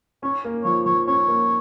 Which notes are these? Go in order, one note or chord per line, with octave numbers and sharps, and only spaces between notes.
C#4 C#5
A#3
F3 C#5
F3 C#5
C#4 C#5
A#3